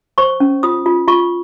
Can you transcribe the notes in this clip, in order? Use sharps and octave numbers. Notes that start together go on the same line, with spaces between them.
C5 C#6
C#4
F4 D#6
F4
F4 C#6